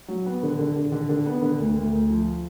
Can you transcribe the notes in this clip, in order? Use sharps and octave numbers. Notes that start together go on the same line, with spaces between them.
F#3
B3
D3
D3
D3
D3
D3
B3
D3
D2
D2
D2
F3